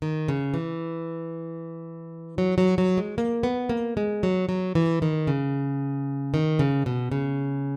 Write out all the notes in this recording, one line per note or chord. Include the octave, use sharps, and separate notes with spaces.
D#3
C#3
E3
F#3
F#3
F#3
G#3
A#3
B3
A#3
G#3
F#3
F#3
E3
D#3
C#3
D#3
C#3
B2
C#3